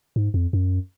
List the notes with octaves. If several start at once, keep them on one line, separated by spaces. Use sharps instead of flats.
G#2
F2
F#2